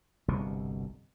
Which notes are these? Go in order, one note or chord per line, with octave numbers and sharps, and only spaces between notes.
G1 C2 B2